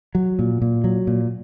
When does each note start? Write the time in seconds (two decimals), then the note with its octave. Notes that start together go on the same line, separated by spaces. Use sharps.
0.15 F#3
0.39 A#2
0.62 A#2
0.84 F#3
1.07 A#2